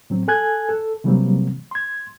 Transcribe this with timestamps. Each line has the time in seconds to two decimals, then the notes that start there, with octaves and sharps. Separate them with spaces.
0.10 A2 F#3 C4
0.28 A4 G#5 F#6 G#6
0.69 A4
1.04 C3 E3 F#3 G3 A#3 C4
1.71 C6 G#6